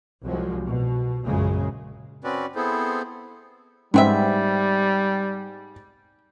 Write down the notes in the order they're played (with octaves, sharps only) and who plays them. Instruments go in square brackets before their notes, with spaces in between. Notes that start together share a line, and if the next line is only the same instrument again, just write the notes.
[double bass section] C2 F3 F#3 G#3
B2
A#1 F#2 C#3 G#3
[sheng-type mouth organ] C4 C#4 F#4 B4 D5
B3 C4 E4 G#4 A4 C5
[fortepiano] G#2 [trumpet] G3 [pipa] B3 C4 E5